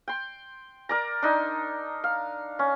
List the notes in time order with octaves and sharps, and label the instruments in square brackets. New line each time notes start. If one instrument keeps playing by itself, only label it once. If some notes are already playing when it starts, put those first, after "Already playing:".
[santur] G5 C6
A#4 D5 A#5
D4 D#4 C6
F5
C#4